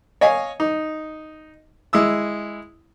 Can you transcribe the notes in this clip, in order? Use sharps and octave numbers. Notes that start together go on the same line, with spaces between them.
C#5 D#5 F5 G#5
D#4
G#3 E4 D#6 E6